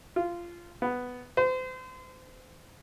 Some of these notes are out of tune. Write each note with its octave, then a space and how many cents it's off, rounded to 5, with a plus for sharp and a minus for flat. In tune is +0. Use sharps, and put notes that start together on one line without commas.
F4 -15
B3 +5
C5 -35